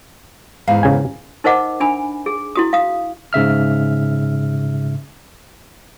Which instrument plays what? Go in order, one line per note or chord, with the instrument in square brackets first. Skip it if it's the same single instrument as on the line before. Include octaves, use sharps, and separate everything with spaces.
[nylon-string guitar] E2 G#2 F5
[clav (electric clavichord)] C#3 G#5
[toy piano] D#4 A#4 C5 D#5 F#5 D6
D4 G#5 B5
G#4
E4 F#4 D#6
F5 D#6
[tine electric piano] G#2 C#3 E5 F6